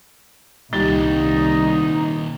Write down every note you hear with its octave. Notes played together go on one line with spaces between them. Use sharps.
C2 A#2 D#3 G3 D#4 A6 G7